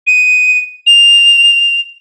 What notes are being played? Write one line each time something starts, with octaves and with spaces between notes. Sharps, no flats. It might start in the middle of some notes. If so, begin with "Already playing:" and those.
D#7
F7